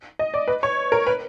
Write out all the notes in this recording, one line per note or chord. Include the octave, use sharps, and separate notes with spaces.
D#5
D5
B4
C#5
A#4
B4